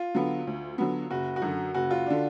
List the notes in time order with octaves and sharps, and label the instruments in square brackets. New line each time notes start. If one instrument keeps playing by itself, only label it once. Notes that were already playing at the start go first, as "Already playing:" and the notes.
Already playing: [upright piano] F4
[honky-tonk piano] D3 F#3 B3
D2
D3 F#3 B3
[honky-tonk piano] F#1 [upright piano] F#4
[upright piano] F#4
[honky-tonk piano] F#2 D3
[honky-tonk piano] F#1 [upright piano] F#4
[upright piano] F4
D4
[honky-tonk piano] D3